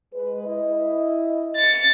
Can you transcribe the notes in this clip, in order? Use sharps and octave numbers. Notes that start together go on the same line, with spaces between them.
G#3 B4
E4 D#5
A6 C#7